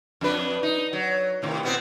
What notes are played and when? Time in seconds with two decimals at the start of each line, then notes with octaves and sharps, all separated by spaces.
0.21 F2 D4 B4
0.63 D#4
0.93 F#3
1.42 A2 C3 D#3
1.63 B2 B3 C4